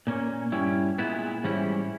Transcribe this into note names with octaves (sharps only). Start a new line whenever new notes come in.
A#2 A#3 C#4
G2 G3 C#4 E4
A#2 G#3 B3 E4
G#2 E3 G3 C#4 E4